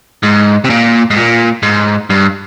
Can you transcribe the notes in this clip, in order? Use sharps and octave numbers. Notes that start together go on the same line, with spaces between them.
G#2
C3
A#2
G#2
A#2
G#2
G2